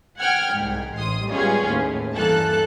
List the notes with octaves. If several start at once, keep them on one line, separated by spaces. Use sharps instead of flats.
F#5 G5 F6 G#6
C2 G#2
A1 C6 D#6
G3 G#3 B3 C#4 F4 G#4
D#2 A2
G2 E3 A#3 A4 A5 F#6